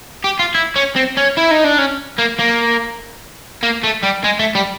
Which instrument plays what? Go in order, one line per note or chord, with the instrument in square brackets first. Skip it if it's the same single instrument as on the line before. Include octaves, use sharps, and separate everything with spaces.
[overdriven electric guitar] G4
F4
E4
C#4
C4
C#4
E4
D#4
D4
C#4
A#3
A#3
A#3
A3
G3
G#3
A3
G3